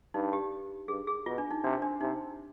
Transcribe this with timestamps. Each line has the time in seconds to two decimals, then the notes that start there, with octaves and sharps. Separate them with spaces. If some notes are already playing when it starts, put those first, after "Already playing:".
0.14 G2 D#4
0.33 G4
0.88 G2 G#4
1.07 G#4
1.26 B2 F4
1.38 D4
1.51 D#4
1.64 C3 D4
1.82 D4
2.01 C3 D#4